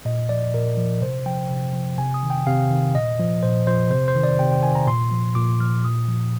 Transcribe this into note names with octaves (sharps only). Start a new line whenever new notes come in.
A#2 D#5
F3 D5
A#2 A#4
F3
C3 C5
F3 G5
C3
F3
C3 G#5
D#6
D#3
G5
C3 F5
D#3
A#2 D#5
F3
A#2 C5
F3 C5
C3 C5
C5
D#3
D5
C3 G5
G5
D#3 G#5
A#5
A#2 C6
F3
A#2 D6
F3 F6
A#2 D#6
F3